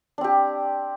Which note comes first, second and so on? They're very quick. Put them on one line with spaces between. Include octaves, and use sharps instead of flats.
D4 C4 G4